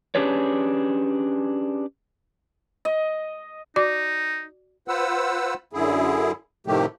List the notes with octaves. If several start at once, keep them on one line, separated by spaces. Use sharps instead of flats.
C#4 D4 G4 G#4 B4 C#5
D#5
D#4 F#4 D5 D6
F4 B4 C5 F#5 E6
F#2 D3 E4 G#4
A2 C3 D#3 F3 A3 G4